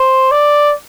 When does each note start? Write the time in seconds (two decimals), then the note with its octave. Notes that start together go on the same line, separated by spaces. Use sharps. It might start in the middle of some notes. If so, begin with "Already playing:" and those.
Already playing: C5
0.31 D5